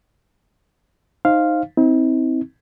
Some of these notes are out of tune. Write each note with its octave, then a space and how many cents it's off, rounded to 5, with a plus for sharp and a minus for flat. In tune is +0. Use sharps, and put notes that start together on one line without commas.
D#4 +0 C5 +15 F5 -5
C4 +0 D#4 +45